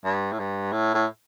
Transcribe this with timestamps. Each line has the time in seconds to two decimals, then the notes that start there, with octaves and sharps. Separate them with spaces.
0.05 G2
0.32 A2
0.39 G2
0.73 A2
0.94 A2